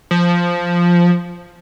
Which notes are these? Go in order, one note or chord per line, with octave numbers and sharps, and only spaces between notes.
F3